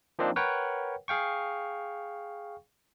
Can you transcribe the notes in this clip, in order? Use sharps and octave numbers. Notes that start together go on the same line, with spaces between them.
F3 A#3 C4 D4 D#4
A#4 B4 C#5 F#5 G5
G#4 F5 G5 C#6